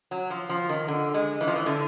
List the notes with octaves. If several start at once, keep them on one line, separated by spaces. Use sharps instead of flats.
F#3
F3
F3
D#3
D3
G#3
E3
F3
E3
D3